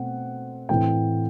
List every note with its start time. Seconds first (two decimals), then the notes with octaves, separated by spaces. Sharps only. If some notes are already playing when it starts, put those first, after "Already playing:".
Already playing: B2 A3 C4 F#5
0.69 A2 E3 A3 C4 G5